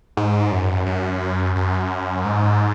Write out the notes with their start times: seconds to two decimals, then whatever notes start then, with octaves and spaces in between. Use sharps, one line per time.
0.17 G#2
0.52 F#2
0.86 F#2
1.56 F#2
2.25 G#2